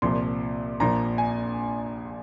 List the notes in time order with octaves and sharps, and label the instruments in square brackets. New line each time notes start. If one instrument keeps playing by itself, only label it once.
[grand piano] C2 A#2 F3 C6
A#1 A#2 F3 A#5
G#5